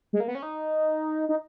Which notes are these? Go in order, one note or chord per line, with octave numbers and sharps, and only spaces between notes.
G#3
A#3
B3
C#4
D#4
D#4